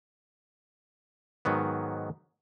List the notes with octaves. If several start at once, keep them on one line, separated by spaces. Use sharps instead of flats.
G#2 D#3 F#3 B3